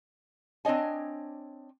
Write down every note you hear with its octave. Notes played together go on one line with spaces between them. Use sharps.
C4 D4 C#5 D#5 G#5